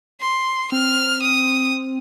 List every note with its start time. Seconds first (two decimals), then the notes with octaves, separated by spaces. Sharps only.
0.21 C6
0.72 C4 F6
1.23 D#6